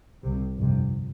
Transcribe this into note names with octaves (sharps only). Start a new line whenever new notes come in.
C2 C3
G1 F2 C3